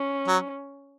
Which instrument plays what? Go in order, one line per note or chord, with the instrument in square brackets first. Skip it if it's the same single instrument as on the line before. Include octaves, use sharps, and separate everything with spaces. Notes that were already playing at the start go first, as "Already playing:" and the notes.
Already playing: [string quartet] C#4
[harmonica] F#3